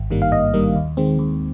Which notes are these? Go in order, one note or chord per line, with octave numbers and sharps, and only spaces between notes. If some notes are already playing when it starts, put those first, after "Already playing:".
Already playing: G#1
G2 D#3 G3 A#3
F5
G#1 D#5
G2 D#3 G3 A#3
D#2
D#3 G#3 C4
D#2